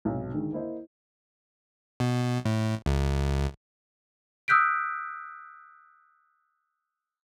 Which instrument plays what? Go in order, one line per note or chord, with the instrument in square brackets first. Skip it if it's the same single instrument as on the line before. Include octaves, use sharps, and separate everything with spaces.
[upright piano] B1 G#2 C3
D3 D#3 G#3
A#3 E4 C5 D#5
[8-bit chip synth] B2
A2
C#2
[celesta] D#6 E6 F#6 G6 B6 D7